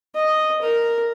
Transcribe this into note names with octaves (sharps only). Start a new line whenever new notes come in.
D#5
A#4